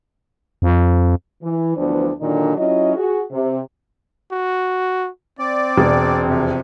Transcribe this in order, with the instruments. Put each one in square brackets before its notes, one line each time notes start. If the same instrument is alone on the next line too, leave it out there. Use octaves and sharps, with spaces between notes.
[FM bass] F2
[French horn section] E3
D2 E3 F3 B3 D4 C5
A#2 D3 D#3 F#3 D4 D#4
F#3 C#4 E4 F4 D#5
F#4 G#4
C3
[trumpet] F#4
[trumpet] C4 [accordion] D5
[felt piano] E1
[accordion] F2 C3